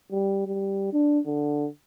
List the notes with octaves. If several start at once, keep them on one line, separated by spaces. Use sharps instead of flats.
G3
G3
D4
D3